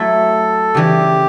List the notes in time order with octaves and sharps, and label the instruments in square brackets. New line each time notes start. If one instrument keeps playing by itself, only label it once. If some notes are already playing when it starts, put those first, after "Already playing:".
Already playing: [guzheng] F#3 A3 E4 [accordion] A4
[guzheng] C#3 E3 G3 [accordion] G4